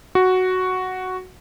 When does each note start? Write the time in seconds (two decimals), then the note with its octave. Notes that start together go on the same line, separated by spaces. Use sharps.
0.15 F#4